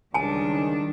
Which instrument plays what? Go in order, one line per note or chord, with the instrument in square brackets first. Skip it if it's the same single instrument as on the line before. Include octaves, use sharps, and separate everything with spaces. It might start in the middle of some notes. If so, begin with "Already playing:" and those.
[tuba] C#2 [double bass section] D#3 [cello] G3 D4 [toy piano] G#5 A5